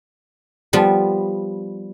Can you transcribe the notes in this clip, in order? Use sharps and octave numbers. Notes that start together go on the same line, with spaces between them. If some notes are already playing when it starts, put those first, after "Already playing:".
F3 G3 B3 F4